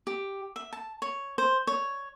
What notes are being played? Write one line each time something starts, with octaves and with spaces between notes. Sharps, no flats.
G4
E5
A5
C#5
C5
C#5